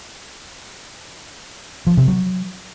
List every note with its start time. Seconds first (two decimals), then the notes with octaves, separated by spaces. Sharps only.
1.87 F3
1.97 C3
2.08 F#3